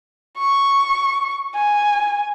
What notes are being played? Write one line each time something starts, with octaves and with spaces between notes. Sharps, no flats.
C#6
G#5